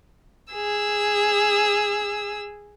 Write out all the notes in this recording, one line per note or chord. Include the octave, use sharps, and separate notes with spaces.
G#4 E6